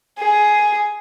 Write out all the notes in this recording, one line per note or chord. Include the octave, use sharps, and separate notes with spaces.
G#4